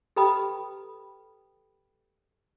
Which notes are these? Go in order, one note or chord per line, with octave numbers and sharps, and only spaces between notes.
G4 A4 B4 G5 B5 D#6